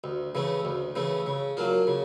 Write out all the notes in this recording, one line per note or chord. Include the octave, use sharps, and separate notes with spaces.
D2
C#3 E3 A3
D2
C#3 E3 A3
C#3
F#3 A#3 D4 F4
C#3